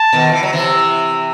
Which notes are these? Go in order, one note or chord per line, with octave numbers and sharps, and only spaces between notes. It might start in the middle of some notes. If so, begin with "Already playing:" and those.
Already playing: A5
B2 D#3
E3
F#3
C3 E3